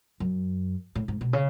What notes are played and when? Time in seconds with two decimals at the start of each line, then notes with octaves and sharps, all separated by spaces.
0.20 F#2
0.95 A2
1.08 G#2
1.21 B2
1.33 C#3